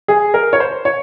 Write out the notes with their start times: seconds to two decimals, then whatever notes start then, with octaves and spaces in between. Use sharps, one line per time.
0.08 G#4
0.34 A#4
0.53 C#5
0.60 C5
0.85 C#5